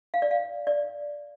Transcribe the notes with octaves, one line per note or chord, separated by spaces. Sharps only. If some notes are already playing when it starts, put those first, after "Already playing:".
F5
D5
F5
D5